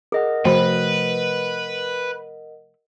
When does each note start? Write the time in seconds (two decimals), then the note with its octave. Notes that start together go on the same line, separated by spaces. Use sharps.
0.12 G#4 A#4 D#5 F#5
0.45 C3 F3 A3 F#4 B4 C5 G5